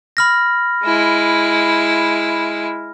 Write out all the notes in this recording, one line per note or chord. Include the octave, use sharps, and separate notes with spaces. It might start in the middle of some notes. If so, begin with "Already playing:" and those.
B5 F6 A#6
G#3 E4